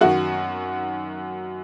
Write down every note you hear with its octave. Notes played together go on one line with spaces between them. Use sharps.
F#2 D#3 F#4